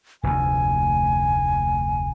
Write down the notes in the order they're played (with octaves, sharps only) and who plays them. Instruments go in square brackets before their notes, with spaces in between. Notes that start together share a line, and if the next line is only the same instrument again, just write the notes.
[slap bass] F1 D2 [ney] G#5